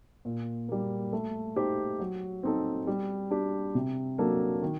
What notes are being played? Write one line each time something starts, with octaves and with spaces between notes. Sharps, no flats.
A#2
G3 A#3
A3
D#4 G4 C5
F#3
C4 D#4 A4
G3
D4 G4
C3
F#3 A#3 D4 A4
D#3